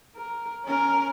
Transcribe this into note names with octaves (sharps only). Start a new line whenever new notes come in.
A#4
C#4 A#4